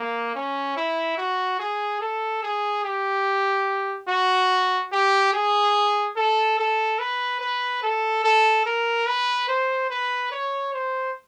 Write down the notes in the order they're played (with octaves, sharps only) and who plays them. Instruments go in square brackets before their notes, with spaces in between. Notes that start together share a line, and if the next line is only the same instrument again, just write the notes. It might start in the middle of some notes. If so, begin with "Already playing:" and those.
Already playing: [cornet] A#3
C#4
E4
F#4
G#4
A4
G#4
G4
F#4
G4
G#4
A4
A4
B4
B4
A4
A4
A#4
B4
C5
B4
C#5
C5